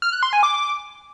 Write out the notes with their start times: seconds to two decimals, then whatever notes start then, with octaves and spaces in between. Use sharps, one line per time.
0.02 F6
0.12 F#6
0.23 C6
0.33 G#5
0.43 D6